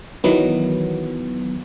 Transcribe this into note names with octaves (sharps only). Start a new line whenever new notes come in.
D#3 E3 F#3 B3